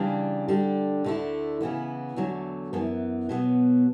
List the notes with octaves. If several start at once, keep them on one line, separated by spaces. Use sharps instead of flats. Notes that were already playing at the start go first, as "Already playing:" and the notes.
Already playing: C#3 E3 G3 D4
D3 G3 D4
D2 D3 A3 E4
C#3 E3 B3 E4
E2 D3 F#3 A3
F#2 E3 B3
B2 F#3 B3